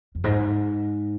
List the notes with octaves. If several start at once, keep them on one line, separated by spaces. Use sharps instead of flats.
F2
G#2